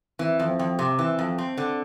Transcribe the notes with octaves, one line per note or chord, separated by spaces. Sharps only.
E3 C4
F2
C4
F2
C3
E3
F2
C4
D3